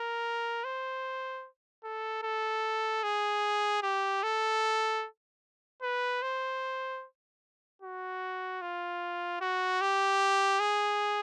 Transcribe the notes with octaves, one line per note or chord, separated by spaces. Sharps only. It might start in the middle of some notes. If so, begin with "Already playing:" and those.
Already playing: A#4
C5
A4
A4
G#4
G4
A4
B4
C5
F#4
F4
F#4
G4
G#4